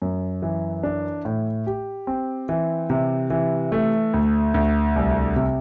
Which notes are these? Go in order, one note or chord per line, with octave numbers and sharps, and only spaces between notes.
F#2
E3
D4
A2
G4
C4
E3
C3
E3
A3
D2
D2
C2
C3